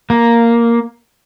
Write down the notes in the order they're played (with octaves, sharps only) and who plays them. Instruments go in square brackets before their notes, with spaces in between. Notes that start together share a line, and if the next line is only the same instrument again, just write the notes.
[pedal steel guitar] A#3